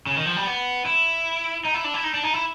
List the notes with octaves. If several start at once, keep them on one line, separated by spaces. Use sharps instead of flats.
C#3
D#3
F3
G3
B3
E4
D#4
E4
D4
E4
D#4
D4
D#4
E4